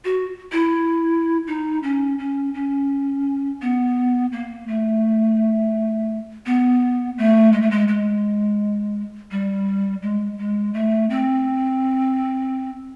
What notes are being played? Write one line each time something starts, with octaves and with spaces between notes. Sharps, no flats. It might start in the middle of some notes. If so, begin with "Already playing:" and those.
F#4
E4
D#4
C#4
C#4
C#4
B3
A#3
A3
B3
A3
G#3
A3
G#3
G#3
G3
G#3
G#3
A3
C4